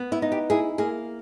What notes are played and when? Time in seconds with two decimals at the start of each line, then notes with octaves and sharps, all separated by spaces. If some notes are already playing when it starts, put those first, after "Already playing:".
Already playing: B3
0.12 E4
0.22 D#4
0.32 G4
0.50 E4 G#4
0.78 A#3 G#4